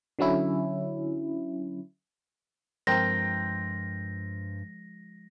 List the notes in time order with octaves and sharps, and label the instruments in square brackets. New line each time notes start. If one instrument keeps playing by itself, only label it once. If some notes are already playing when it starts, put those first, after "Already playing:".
[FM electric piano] D3 F#3 C#4 E4
[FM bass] G2 [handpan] F3 G#3 [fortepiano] C4 A#4 G5 [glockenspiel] A#6